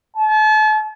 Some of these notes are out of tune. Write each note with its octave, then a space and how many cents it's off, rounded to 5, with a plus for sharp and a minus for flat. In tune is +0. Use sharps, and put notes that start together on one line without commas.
A5 -40